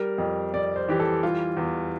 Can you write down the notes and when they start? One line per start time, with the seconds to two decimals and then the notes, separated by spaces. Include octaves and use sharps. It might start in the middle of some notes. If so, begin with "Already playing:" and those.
Already playing: G3 A#4
0.18 F2
0.53 F2 D5
0.76 C5
0.89 E3 G4
1.00 A4
1.23 G3 F4
1.57 E2